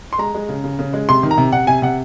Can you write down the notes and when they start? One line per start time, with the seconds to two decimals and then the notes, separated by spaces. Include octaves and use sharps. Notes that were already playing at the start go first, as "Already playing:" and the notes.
0.13 C6
0.18 G#3 A#5
0.35 G#3
0.49 C#3
0.64 C#3
0.79 C#3
0.93 G#3
1.09 C3 C6
1.23 D#3
1.31 A#5
1.38 C3
1.52 C3 F#5
1.67 C3 G#5
1.82 C3 F#5